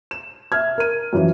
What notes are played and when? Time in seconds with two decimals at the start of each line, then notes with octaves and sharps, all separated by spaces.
0.11 E7
0.52 E5 F6 G#6
0.78 A#4 D#7
1.13 F#2 E3 F3